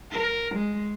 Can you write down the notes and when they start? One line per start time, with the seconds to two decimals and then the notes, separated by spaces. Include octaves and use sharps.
0.12 A#4
0.55 G#3